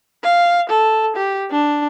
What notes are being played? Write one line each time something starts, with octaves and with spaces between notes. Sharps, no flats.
F5
A4
G4
D4